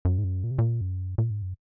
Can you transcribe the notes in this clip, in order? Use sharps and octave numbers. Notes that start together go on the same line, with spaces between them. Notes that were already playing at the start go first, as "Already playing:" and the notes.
F#2
G#2
F#2
A#2
C3
A#2
F#2
A#2
G#2
F#2